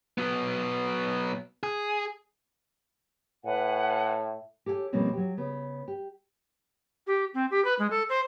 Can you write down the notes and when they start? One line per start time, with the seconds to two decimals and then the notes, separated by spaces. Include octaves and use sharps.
0.18 F#3 B3
1.63 G#4
3.45 A2 B4 F#5 G#5
4.66 G4 A4 C#5 F5 G#5
4.93 B2 F3 G3 A#3 C4 C#4
5.13 F#3 G4
5.37 C#3 B3
5.88 G4
7.07 G4
7.34 C4
7.51 G4
7.65 B4
7.79 G#3
7.91 A4
8.09 C5